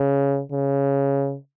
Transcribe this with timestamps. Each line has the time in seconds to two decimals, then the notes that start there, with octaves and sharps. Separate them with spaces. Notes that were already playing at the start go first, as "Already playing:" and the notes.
Already playing: C#3
0.52 C#3